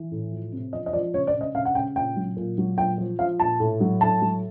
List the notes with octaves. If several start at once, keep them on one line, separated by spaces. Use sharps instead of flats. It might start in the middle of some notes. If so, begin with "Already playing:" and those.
Already playing: E3
A2
F3
C3
F3 D#5
D#5
F3 D5
C#3 C#5
D5
C#3
D#5
C#3 F5
F#5
C#3 G5
A#2 G5
F#3
A#2
F#3
A#2 G5
F3
F3 F5
A#2 A5
A2
F#3
A2 A5
F#3